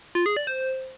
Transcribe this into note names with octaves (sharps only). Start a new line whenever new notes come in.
F4
G#4
D5
C5